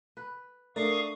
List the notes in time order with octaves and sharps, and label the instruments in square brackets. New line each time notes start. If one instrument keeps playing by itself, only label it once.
[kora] B4
[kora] A3 [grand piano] D4 [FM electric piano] A#4 [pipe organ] F5 C#6 D#6